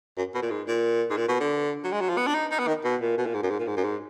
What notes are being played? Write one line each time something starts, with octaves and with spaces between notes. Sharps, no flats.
F#2
B2
A#2
G#2
A#2
G#2
A#2
B2
D3
F#3
G#3
F#3
F3
B3
D4
D#4
D#4
B3
D#3
B2
A#2
B2
A#2
G#2
F#2
G#2
A#2
G#2
F#2
G#2